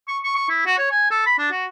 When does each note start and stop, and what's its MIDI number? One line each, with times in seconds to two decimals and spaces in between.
0.08 0.18 85
0.23 0.31 85
0.36 0.48 85
0.49 0.61 64
0.66 0.78 66
0.78 0.91 73
0.91 1.06 80
1.11 1.21 69
1.26 1.35 83
1.39 1.50 62
1.52 1.66 66